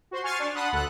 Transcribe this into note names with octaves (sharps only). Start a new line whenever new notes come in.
F#4 C5 C6
G#5 C#6 F6 A6 C7 D#7
D4
F#5 A5 B5 C6 D#6 F#6
D2 A4 F#5 F#6